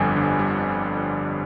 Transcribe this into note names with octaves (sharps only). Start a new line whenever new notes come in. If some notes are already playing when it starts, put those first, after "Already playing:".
Already playing: G1 F2 D3 G3 G#5
D3
G3